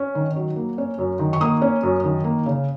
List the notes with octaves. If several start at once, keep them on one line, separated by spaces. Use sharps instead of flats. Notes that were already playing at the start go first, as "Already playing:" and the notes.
Already playing: C#4
D#3
F#3
A#3
C#4
F#2
D#3
C#6
A#3 D#6
C#4
F#2
D#3
A#3
C#3